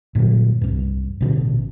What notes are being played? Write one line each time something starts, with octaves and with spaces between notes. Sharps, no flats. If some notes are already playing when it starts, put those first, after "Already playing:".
G2 A#2 D3 F#3
C2 G2
A1 B2 D3